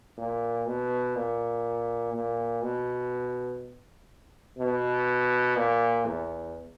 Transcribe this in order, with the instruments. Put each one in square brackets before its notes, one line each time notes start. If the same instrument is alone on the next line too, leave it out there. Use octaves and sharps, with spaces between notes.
[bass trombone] A#2
B2
A#2
A#2
B2
B2
A#2
E2